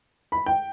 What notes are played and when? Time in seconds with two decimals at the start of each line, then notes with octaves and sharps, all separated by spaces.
0.32 B5
0.46 G5